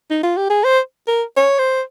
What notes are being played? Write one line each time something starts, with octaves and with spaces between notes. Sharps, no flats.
D#4
F4
G4
G#4
C5
A#4
C#5
C5